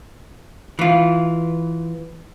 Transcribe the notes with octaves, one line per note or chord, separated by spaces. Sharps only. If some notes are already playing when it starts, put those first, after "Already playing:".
E3 F4